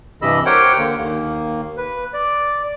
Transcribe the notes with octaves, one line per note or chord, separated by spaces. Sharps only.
G2 C3 E3 D#5 B5 E6
G4 A#4 C5 C#5 F#5 G5
D3 A#3
D#2 A#3
B4
D5